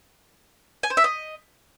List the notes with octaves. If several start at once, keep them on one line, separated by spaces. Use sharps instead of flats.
G#5
C5
E5
D#5